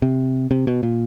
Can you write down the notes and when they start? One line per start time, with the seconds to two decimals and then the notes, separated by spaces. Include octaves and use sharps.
0.02 C3
0.51 C3
0.67 B2
0.83 A#2